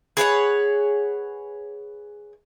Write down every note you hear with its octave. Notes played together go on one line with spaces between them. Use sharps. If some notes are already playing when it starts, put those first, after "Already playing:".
G#4 B4 C#5 F#5